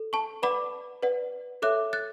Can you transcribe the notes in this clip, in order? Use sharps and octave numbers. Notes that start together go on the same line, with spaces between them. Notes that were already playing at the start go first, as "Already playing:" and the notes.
Already playing: A4
A5 C#6
B4 D5 F#5 B5 D6
B4 D5 F#5
A4 C#5 E5 D6 F#6
F#6 A6